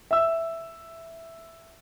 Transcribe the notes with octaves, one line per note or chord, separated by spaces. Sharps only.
E5 E6